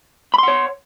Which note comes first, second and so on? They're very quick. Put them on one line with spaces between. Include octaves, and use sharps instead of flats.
B5 C6 F#5 C#5